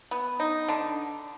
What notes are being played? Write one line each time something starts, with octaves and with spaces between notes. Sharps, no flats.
B3
D#4
D3